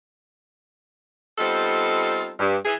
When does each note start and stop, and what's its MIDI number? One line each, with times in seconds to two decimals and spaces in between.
1.38 2.32 55
1.38 2.32 59
1.38 2.32 60
1.38 2.32 63
1.38 2.32 65
1.38 2.32 69
2.39 2.56 43
2.65 2.75 52
2.65 2.75 68